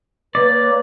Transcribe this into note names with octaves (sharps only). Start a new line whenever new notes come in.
A#3 B4 C#5 D5